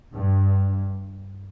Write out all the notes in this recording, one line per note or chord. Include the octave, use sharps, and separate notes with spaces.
G2